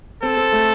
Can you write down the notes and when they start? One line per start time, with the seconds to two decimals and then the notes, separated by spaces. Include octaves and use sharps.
0.23 C4 A4
0.37 C4
0.52 A3